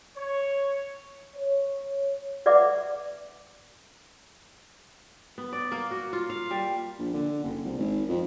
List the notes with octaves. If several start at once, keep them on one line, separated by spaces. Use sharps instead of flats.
C#5
C#5
B4 D5 E5 F#5 D6
B3
D5
A#3
F#4
F4
F5
G3
A#1
D3
F#1
C2
G#1
F2